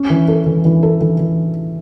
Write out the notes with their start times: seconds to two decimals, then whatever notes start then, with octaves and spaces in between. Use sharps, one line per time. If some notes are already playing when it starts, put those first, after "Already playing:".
Already playing: C#4
0.10 E3
0.28 A4
0.46 E3
0.65 E3
0.83 A4
1.01 E3
1.19 E3